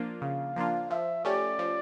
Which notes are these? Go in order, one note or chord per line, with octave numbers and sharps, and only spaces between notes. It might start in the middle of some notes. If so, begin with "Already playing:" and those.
Already playing: F3 A#3 D4 F4
C#3 F5
F3 A#3 D4 F4
F3 E5
A3 C#4 G4 D5
F3